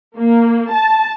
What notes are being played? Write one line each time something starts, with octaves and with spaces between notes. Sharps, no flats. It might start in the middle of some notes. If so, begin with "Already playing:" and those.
A#3
A5